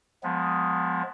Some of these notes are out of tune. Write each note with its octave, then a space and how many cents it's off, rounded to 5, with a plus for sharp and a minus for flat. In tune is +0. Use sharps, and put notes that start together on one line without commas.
F3 +30 G#3 +0 B3 +15